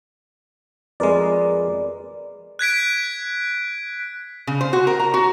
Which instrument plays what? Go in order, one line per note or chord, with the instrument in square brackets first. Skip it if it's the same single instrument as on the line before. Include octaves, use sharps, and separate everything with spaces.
[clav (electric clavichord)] F2 G#3 [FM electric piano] A#4 B4 D5
[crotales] F#6 G#6 B6 D7
[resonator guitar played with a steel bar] C#3
C5
F#4
A#4
A#5
F#4